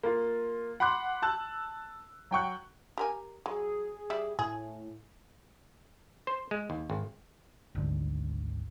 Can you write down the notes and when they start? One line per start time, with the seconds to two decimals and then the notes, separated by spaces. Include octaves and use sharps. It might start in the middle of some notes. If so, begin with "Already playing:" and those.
0.03 A#3 F4
0.80 F#5 B5 C6 D6 F#6
1.22 A5 E6 F#6
2.31 F#3 G5 C#6 F#6
2.98 G4 A#4 G#5
3.46 F#3 G#4
4.10 G3 D5 E5
4.39 A2 G#4
6.27 C5
6.51 G#3
6.70 D#2
6.90 G#1
7.75 G#1 D2 G#2 D3